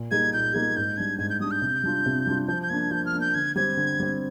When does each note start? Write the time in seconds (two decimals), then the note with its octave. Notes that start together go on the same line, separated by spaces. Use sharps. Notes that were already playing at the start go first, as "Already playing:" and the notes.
Already playing: A#2
0.11 G3 A#3 D#4 G#4 G#6
0.33 A#2 G6
0.54 G3 A#3 D#4 G#4 G#6
0.76 G#2 G6
0.97 G3 D4 G#6
1.19 G#2 G#6
1.30 G6
1.40 G3 D4 D#6
1.51 G6
1.61 C3
1.83 G3 D4 F4
2.06 C3
2.26 G3 D4 F4
2.48 F3 G6
2.63 G6
2.69 A#3 D4 G#6
2.91 F3 G6
3.06 F6
3.13 A#3 D4
3.21 G6
3.35 D3 G#6
3.56 G3 C4 G#6
3.77 D3
4.00 G3 C4